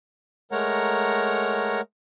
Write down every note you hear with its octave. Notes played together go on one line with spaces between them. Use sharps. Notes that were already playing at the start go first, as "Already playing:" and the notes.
G#3 A3 A#4 C#5 F#5 A#5